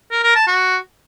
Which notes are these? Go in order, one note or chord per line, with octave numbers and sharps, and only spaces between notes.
A#4
A#4
A5
F#4